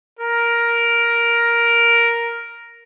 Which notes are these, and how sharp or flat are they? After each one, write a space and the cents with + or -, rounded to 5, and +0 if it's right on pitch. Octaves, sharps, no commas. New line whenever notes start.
A#4 +5